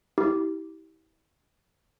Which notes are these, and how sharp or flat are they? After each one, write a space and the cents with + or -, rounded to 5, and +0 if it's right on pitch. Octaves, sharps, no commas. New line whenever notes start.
E4 -35 G4 -10